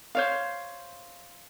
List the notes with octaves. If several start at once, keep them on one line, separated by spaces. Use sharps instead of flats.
C5 C#5 F5